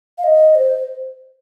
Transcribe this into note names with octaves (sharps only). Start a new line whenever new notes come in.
F5
D#5
C5